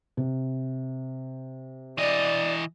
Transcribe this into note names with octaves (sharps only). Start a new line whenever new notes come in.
C3
E3 D5 D#5